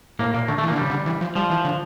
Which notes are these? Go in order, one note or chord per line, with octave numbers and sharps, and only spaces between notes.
A2 A#3
A#2 A#3
D3 A3
A3
E3
A#3
D3
C#3 G3
D3
E3
F3
F3 G3
E3
D3